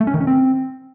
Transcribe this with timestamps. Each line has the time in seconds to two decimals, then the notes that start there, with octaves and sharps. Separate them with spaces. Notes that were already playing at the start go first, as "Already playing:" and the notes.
0.01 A3
0.07 C#4
0.14 D#3
0.21 C#4
0.27 C4